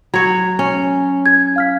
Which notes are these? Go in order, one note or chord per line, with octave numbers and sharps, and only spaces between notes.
F#3 C#5
C#4
G#6
F5 F6 B6